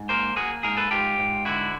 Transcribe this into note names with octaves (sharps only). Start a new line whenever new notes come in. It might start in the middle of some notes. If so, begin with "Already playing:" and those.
Already playing: G#2
A#3 A#4 C5
A#3 F#4 G#4
G#2 G#4 A#4
A4 B4
G#2 F4 G4
G#2
D3 E4 F#4